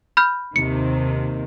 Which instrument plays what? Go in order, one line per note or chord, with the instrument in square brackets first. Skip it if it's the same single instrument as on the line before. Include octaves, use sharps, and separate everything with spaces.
[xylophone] B5 F6 G6
[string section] D#2 C3 D#3 [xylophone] C#7